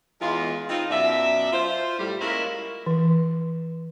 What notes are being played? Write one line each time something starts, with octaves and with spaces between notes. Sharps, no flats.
E2 G#3 F4
C4 D#4 F4
F#2 B2 D5 E5
F4 C5
A2 G3
G#3 A#3 C#4 E4 F4 A#4
E3